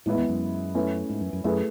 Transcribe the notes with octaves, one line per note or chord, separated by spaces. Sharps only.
A2 E3 G#3 B3 E4
E2
F#2
A3 C#4 E4 B4
G#2
F#2
F#2
F#2 A3 E4 G#4 B4